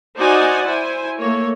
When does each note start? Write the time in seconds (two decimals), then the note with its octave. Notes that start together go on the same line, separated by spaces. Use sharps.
0.16 D#4 F#4 C5 D5 F#5 G#5
0.66 E4 C5 G#5
1.17 A3 A#3 C#5